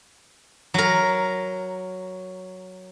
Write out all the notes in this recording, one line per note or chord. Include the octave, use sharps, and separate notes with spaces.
F#3 A#4